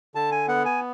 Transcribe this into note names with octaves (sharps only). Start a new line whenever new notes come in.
D3 A5
G#5
B3 F#5
G#5